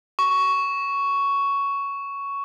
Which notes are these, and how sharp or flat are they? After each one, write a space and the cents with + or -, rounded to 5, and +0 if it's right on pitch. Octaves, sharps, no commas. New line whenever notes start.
C#6 +10